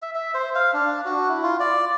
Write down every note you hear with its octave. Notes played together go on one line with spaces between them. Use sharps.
E5
E5
C5
F5
D4
F#4
E4
F4
D5